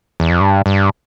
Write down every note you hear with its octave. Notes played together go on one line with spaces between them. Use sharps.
E2
F2
G2
G2